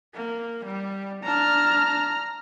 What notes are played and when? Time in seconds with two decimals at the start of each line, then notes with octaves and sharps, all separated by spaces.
0.15 A#3
0.65 G3
1.24 D4 A5 A#5 F6